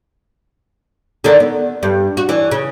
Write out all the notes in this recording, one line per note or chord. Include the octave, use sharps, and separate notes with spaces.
D3 D#3 D4
B3
G2
F#4
E3 D4
C#3